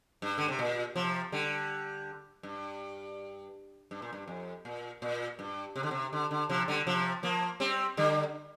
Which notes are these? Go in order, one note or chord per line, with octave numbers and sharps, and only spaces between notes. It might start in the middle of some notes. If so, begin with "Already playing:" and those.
G2
D3
C3
A#2
C3 F3
D3 G3
G2
G2
A#2
G2
F2
A#2
A#2
G2
C3
D3
C3
D3
D3
C3 F3
D3 G3
C3 F3
F3 A#3
G3 C4
D3 G3